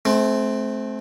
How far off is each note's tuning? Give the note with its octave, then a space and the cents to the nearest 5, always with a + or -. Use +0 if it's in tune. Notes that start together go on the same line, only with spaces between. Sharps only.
A3 -35 C4 +0